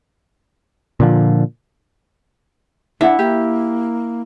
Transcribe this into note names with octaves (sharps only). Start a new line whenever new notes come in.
A#2 D3 F3
D4 E4 F#5
A#3 G4